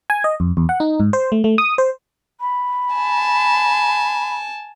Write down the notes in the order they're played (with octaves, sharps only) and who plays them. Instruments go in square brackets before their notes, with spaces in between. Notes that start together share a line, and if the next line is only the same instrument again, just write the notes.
[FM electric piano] G#5
D#5
F2
E2
F#5
D#4
G#2
C5
A3
A3
D#6
C5
[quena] B5
[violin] G#5 A5